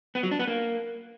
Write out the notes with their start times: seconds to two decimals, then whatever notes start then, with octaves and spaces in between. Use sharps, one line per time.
0.15 B3
0.23 F#3
0.31 D4
0.39 B3
0.48 A#3